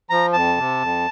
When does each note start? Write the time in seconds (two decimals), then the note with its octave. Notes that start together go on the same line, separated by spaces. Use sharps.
0.10 F3 A#5
0.33 F2 A5
0.57 C3
0.81 F2